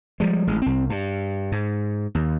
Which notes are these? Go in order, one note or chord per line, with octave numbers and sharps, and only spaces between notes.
F3 G3 G#3
A1 G#3
C2 C4
G2
G#2
D#2